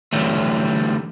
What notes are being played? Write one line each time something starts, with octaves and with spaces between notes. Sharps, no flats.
D3 E3 F#3 G3 A3